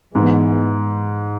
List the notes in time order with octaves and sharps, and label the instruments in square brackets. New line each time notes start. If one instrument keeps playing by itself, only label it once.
[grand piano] G#2 [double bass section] E3 G#3 B3